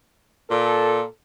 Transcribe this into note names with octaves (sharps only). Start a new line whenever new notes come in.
A#2 A4